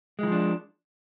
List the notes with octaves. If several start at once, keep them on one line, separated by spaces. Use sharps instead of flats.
E3 F3 G#3 D4